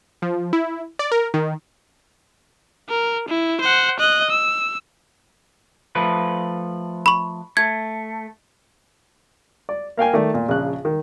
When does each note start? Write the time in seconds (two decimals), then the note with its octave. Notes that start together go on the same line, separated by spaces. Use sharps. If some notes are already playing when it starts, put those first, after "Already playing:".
0.22 F3
0.53 E4
0.99 D5
1.12 A#4
1.34 D#3
2.89 A#4
3.29 E4
3.61 C5 F#5
3.99 D#5 F#6
4.31 E6
5.95 F3 A3 B4
7.06 B5 C#6
7.57 A3 G#6
9.69 D5
9.97 A#3 F5 G5 G#5
10.13 D#3 A3 D5
10.34 A#2
10.49 A#1 C#3 F#6
10.85 D#3